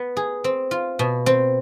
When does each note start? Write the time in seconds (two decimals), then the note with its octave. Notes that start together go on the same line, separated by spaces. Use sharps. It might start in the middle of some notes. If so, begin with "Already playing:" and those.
Already playing: B3
0.17 G#4
0.44 C4
0.71 F4
0.99 B2
1.26 C4